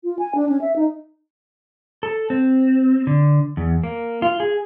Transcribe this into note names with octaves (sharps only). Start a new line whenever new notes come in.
F4
G#5
D4
C#4
E5
D#4
A4
C4
D3
E2
A#3
F4
G#4